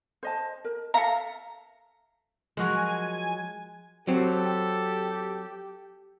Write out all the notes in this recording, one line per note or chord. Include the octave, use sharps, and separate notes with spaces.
C5 D#5 A5
A#4
A4 E5 F5 A#5
F3 F#3 G#3 F#4 A#4 G#5
F#3 C4 G4 A4